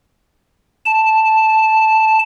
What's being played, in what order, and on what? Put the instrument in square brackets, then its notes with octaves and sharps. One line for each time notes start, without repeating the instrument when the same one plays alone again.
[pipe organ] A5